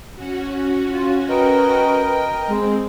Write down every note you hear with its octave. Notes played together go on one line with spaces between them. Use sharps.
C#4 F#4
F4
A#4 B4 D#5 G5
G#3 C4